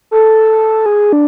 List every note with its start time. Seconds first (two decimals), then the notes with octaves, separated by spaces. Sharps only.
0.11 A4
0.86 G#4
1.13 D4